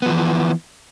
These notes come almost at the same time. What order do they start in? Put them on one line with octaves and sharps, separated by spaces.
B3 F3 E3